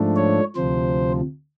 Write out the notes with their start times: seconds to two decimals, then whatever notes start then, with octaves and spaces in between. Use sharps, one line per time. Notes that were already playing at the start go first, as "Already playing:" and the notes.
Already playing: G#2 F3 A3 D4
0.16 C#5
0.56 D2 C3 F3 C5